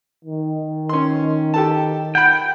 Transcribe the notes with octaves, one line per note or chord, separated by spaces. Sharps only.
D#3
C#4 C6
G4 A4 A5
F#5 G5 B5